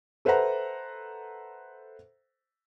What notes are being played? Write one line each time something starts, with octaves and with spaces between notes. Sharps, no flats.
A4 B4 C5 E5 F#5 A#5